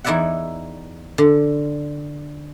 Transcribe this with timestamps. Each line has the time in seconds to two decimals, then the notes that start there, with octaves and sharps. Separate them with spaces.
0.04 E2 D#4 E4 D5 E5 F#5
1.18 D3